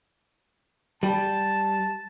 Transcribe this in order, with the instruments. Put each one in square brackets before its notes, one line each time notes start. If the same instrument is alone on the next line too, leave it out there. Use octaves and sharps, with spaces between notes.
[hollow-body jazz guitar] G3 [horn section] A5